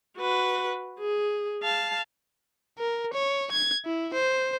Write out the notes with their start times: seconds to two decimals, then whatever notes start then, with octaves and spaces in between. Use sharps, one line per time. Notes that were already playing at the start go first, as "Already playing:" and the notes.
0.18 F#4 B4
0.99 G#4
1.63 F5 A5
2.78 A#4
3.13 C#5
3.52 G#6
3.85 E4
4.14 C5